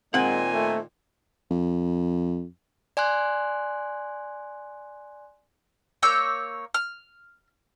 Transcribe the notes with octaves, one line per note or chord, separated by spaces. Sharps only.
A#2 D#3 G#3 C4 F#5 G#5
A3
F2
D5 G#5 C6 F#6
A#3 C#5 E6 G6
F6